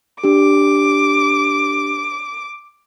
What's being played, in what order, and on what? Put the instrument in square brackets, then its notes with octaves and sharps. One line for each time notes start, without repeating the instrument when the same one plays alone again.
[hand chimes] D4 G4 [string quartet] D6